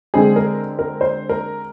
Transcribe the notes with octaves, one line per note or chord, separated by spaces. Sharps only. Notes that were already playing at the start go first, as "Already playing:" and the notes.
D3 G#3 C4 G#4
A#4
A#4
C5
A#4